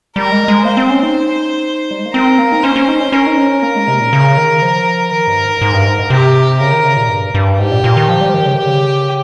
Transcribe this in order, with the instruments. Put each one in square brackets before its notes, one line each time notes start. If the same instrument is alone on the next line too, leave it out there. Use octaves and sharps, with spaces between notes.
[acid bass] G3 [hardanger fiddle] A#4
[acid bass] G#3
G#3
[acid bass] A#3 [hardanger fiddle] C5
[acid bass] C4
C#4
D#4
G3
G#3
A#3
[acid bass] C4 [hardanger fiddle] A#4
[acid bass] A#3
D#4
[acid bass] C#4 [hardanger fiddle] C5
[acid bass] C#4
D#4
C#4
[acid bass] C#4 [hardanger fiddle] A#4
[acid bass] D#4
C#4
[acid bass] A#3 [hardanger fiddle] A#4
[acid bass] G#3
C3
A#2
C#3
D#3
F3
[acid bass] D#3 [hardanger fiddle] A#4
[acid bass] G2
G#2
G#2
G2
G#2
[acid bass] C3 [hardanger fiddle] G4
[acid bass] C#3 [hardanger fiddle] A#4
[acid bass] D#3
C#3
A#2
G2
G2
[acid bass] G#2 [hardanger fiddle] G4
[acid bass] A#2
A#2
D#3
F3
G3
F3
D#3
C#3
[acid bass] D#3 [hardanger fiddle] G4
[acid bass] C#3